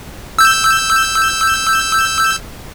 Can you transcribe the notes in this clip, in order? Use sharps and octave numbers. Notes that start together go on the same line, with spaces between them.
E6 G6